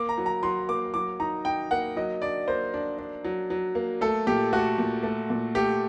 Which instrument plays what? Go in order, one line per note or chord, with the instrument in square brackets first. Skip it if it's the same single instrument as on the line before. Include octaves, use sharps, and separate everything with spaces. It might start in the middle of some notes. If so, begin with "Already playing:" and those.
Already playing: [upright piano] A#3 [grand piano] D6
[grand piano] A#5
[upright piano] F#3
[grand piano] A#5
[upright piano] F#3 [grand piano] C6
[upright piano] A#3 [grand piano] D6
[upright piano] F#3 [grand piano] D6
[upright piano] D#4 [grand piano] A#5
[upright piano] D#4 [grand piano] G5
[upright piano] A#3 [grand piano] F#5
[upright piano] F#3 [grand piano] D#5
[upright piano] D4 [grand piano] D5
[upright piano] A#3 [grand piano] C5
[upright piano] D4
D4
F#3
F#3
A#3
[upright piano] A3 [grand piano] A4
[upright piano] A#2 [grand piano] G4
[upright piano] A3 [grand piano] F#4
[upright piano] A#2
A3
A#2
[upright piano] A3 [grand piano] G4